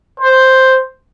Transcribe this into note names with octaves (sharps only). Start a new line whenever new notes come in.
C5